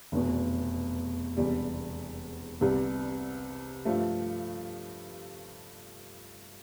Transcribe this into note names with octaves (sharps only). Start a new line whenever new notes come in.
F1 E2 B2
E1 E2 C3 G3
C2 C3 G3 B3
G2 F3 A3